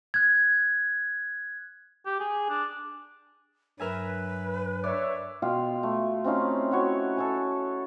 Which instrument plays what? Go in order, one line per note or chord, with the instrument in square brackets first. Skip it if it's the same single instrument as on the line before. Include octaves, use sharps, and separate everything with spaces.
[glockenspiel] F#6 G#6
[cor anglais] G4
G#4
D4
[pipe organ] G2 F#3 [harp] A#4 E5 G#5 [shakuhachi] B4
[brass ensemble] C#5 E5 [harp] D5
[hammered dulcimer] B2 F4 F5 G5
A3
C4 C#4 D#4 F4
E4 F#4 C#5
A4 C#5 G#5